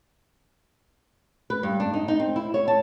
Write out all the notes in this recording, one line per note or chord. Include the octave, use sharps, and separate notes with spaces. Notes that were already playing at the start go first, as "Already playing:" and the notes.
B4
G2
D4
D#4
D#4
C4
E4
C#5
A5